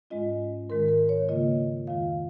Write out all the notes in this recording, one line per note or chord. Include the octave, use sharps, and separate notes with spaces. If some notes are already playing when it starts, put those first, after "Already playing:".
G#2 G#3 C#4 F4 D#5
G#2 D#3 G#3 A#4
A#4
C#5
C#3 A#3 F4 D#5
F2 D#3 G#3 F4 F5